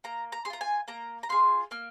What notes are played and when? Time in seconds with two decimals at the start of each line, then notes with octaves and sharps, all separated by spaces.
0.04 A#3 A#5
0.32 A#5
0.45 G#4 C6
0.50 F4 A#5
0.61 G#5
0.88 A#3 A#5
1.23 A#5
1.29 F4 G#4 C6
1.71 A#3 F6